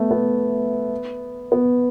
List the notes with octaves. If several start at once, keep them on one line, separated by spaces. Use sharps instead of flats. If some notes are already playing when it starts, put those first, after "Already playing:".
Already playing: A3 B3
B3
B3